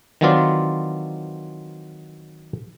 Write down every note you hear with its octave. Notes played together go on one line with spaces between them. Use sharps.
D#3 E3 F#3 C4 F4 D5